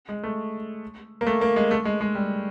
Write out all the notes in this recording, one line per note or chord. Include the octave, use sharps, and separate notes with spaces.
G#3
A3
A#3
A3
A#3
G#3
A3
G#3
G#3
G3